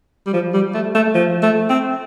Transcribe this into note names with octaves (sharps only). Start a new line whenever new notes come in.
G3
F3
G3
A3
A3
F3
A3
C4